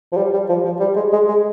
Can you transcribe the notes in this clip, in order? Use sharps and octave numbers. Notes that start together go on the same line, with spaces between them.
F3
G3
G3
F3
F3
G3
G#3
G#3
G#3